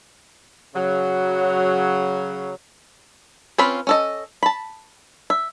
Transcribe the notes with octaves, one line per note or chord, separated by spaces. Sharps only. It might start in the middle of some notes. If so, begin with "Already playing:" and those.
C#3 F#3
C4 C#4 F4 B4 B5
C#4 A4 D#5
A5 B5
E5